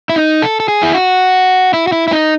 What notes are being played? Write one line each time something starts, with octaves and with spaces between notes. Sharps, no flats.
E4
D#4
A4
A4
G#4
E4
F#4
E4
F#4
E4
E4
D#4